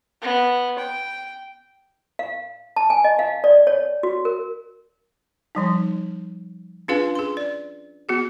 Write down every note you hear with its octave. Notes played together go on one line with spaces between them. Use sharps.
B3
G5
F5
A5
G#5
D#5
F5
D5
C#5
F#4
A#4
F3 G3 D#4
C#4 D4 F4 G#4 B4 F5
G#4 C6
D5
B3 F#4 G#4